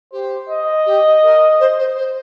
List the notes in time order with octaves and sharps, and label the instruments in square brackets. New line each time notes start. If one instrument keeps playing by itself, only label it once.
[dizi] G4 [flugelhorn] C5
[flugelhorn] D#5
[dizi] G4
A#4
C5
C5
C5